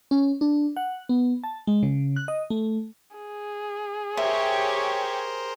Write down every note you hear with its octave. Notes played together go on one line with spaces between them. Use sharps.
C#4
D4
F#5
B3
A5
G#3
C#3
F#6
D#5
A3
G#4
G4 A#4 C5 C#5 E5